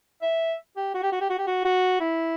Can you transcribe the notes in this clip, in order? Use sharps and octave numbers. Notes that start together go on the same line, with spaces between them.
E5
G4
F#4
G4
F#4
G4
F#4
G4
F#4
F#4
E4